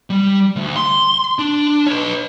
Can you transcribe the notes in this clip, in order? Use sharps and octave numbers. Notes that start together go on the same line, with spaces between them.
G3
D2
C6
D4
B4 C#5